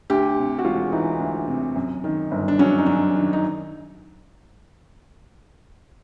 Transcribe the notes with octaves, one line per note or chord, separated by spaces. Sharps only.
D2 G4
C3
F#4
E1 F4
E3 D#4
D2
C3
F#2
D#3
G1
D4
F#3 C#4
D#4
F#2 D4
D#3
D#4